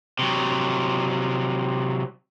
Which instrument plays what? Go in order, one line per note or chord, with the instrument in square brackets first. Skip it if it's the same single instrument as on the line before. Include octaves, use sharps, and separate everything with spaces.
[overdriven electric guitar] C3 F#3